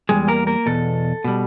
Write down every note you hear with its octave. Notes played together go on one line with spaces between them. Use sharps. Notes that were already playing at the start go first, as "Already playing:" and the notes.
E2 B2 G3 G#3 G#4
A#3 A#4
A#3 A#4
E2 B2 A4
B2 G3